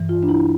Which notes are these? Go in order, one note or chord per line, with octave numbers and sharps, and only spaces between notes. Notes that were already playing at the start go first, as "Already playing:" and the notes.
Already playing: G2 E3
F4
D4
E4